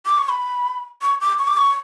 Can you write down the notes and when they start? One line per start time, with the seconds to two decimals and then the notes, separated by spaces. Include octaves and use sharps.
0.06 D6
0.18 C#6
0.29 B5
1.02 C#6
1.21 D6
1.39 C#6
1.48 D6
1.57 C#6